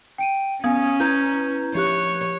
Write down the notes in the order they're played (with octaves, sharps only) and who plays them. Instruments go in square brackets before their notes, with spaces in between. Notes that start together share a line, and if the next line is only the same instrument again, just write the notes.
[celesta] G5 D7 D#7
[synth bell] B3 D#6 G#6 [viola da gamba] C#4 [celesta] F5 G#5
[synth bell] E4 B4 A#5 [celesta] G6 G#6
[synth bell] F3 G4 F#6 [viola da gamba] C#5